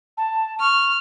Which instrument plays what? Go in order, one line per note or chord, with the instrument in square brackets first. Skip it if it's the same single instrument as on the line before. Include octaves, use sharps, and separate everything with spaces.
[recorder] A5
[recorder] C#6 [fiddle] F6